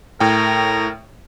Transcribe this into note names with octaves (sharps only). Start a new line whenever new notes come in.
A2 A#4 G5